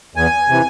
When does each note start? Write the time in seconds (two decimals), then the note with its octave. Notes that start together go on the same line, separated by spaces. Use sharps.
0.15 E2 G#5
0.49 C3 E3